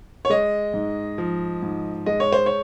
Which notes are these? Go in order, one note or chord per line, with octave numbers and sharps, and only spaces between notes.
C#5
G#3 D#5
G#2
F3
G#2
G#3 D#5
C#5
C5
C#5